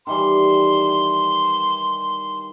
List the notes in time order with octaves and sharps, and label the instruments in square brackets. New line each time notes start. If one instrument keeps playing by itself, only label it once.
[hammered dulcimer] D#3 E3 G3 [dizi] C6